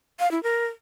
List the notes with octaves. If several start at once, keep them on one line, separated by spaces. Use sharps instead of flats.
F5
E4
A#4